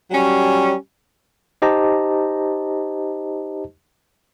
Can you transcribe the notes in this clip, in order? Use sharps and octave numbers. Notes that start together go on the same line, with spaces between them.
F#3 G3 C#4
D#4 G4 C5 D#5 A5 A#5